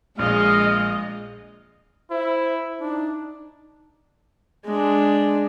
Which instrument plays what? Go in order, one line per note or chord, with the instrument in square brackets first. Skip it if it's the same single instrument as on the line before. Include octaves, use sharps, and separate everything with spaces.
[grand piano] A#1 [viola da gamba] G#3 [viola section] D#5 [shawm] F5
[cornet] E4 [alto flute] C5
[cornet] D4 [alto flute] D#4
[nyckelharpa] G#3 D4